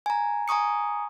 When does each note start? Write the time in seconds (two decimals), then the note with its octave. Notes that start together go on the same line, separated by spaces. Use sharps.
0.06 G#5 A#5
0.48 G#5 A#5 C#6 D#6 C#7